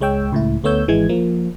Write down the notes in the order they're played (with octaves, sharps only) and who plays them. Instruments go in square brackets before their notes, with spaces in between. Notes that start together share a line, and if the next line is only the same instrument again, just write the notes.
[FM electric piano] C#2 G#3 C#5 G5 E6
C#2 A2 E4
D2 A3 B3 C#5 E6 G6
G#1 E3 G#3 G#6
F3 A#3